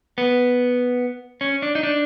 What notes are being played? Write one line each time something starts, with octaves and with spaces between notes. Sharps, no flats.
B3
C#4
D4
D#4
D4